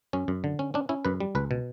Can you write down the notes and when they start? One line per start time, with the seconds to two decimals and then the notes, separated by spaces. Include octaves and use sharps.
0.13 F#2 C#4
0.28 F#2
0.44 D3
0.59 C#4
0.74 C#4 D4
0.89 C#4 E4
1.05 F#2 B4
1.20 G3
1.35 C#2 B4
1.51 B2